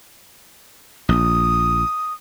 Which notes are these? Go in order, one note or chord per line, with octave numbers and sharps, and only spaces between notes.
A#1 D#6